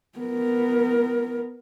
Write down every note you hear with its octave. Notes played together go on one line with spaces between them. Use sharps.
B3 A#4